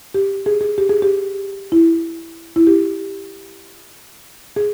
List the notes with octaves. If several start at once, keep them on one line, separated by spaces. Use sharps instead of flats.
G4
G#4
G#4
G4
G#4
G4
E4
E4
G4
G#4